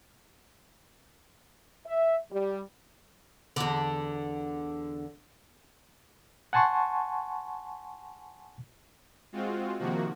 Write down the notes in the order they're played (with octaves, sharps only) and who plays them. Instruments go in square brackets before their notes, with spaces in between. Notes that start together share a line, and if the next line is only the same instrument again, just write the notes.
[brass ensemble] E5
G3
[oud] E2 D3
[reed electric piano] F#5 G#5 A5 C6 C#6
[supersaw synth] G#3 C4 F4 F#4
C3 D#3 F3 A#3 F#4